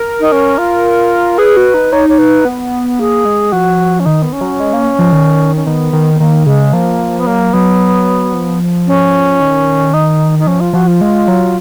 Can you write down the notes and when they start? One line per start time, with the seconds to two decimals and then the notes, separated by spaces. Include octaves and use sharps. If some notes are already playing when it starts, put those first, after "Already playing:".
Already playing: A#4
0.20 D#4
0.32 C#4
0.58 F4
1.38 G#4 B4
1.57 F#4
1.74 D#4
1.92 D#4 C#5
2.09 C#5
2.18 B4
2.45 B3
2.99 A#3 G#4
3.25 G#3
3.52 F3 F#4
4.00 C#4
4.06 D#3 D#4
4.22 B3
4.33 C#4
4.41 F#3
4.60 G#3
4.73 A#3
4.99 F3
5.12 D#3
5.56 C#4
5.66 D#3 B3
5.93 D#3
6.14 B3
6.20 D#3 A#3
6.46 C#3 G#3
6.73 F3 A#3
7.20 B3
7.27 F#3 A#3
7.53 F#3 B3
8.34 F3
8.87 C#4
9.40 D#3
9.94 D#4
10.39 D#4
10.47 F3 C#4
10.60 F4
10.73 F3 F#4
10.87 F4
11.01 G#3
11.28 F#3